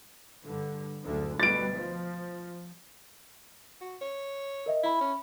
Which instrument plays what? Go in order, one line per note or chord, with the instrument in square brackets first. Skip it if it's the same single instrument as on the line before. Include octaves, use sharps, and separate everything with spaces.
[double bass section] G2 D3
F#1 D2 D3
[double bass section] D2 B2 G3 [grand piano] A6 D7
[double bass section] F3
[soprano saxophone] F#4
C#5
[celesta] A#4 D#5 E5
[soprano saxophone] E4 [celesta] E5 B5
[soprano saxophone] C#4